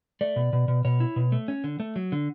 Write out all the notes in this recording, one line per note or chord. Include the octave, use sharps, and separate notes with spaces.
A3 D5
B2
B2
B2
B2 C#5
E4
B2
A3
C#4
D3
A3
F#3
D3